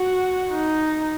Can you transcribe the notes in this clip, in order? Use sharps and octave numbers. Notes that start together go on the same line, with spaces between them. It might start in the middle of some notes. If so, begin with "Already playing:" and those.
Already playing: F#4
D#4